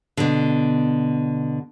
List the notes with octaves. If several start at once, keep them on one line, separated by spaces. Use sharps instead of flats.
B2 D3